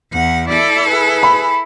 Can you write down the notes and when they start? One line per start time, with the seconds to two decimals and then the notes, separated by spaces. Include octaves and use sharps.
0.12 E2 F#5
0.49 E4 A4 D5
0.89 G#4 B4
1.23 B5